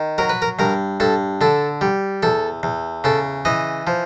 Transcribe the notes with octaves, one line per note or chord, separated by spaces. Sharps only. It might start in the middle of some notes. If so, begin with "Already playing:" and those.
Already playing: D#3
F#3 A#4
B4
A#4
G2 A#4
G2 A4
D3 A4
G3
E2 A4
E2
C#3 A4
E3 D#5
F3